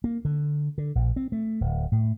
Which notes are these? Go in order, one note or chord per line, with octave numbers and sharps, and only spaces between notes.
A#3
D3
D3
A#1
C4
A3
D1
A2